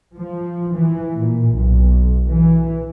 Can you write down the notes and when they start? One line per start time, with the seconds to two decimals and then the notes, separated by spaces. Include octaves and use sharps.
0.16 F3
0.75 E3
1.17 A#2
1.52 B1
2.26 E3